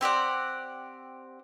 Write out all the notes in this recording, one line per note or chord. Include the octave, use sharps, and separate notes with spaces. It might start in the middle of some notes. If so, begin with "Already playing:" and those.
C4 G4 D5 F#5